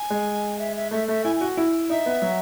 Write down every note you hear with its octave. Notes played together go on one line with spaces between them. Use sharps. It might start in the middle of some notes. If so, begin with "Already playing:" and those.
Already playing: G#5
G#3
E5
E5
A3 E5
A3 E5
E4 G#5
G#5
F#4
E4
D#4 E5
B3
F#3